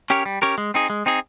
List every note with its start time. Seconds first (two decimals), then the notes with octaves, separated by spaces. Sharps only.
0.10 C#4 G4 A#4 C#5
0.25 G3
0.42 C#4 G4 A#4 C#5
0.58 G#3
0.74 C4 D#4 G#4
0.90 G#3
1.06 C4 D#4 G#4